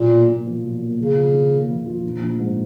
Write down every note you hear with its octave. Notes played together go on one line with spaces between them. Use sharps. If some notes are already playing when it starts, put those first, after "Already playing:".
Already playing: B1 A#2 F4
A#3
A#2
F3
B1
A#3
F2 C#3
F4
D#3
A#3
F2
F4
A#1
A#1
G#2